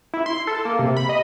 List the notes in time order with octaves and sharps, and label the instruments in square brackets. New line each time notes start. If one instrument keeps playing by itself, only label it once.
[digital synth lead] E4
C6
A4
A#3
C3
B5
D#5